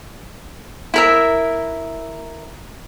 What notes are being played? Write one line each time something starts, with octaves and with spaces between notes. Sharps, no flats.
E4 A#4 E5